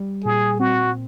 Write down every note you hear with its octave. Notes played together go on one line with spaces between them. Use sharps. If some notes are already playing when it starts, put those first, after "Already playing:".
Already playing: G3
A#2 G#4
C4 F#4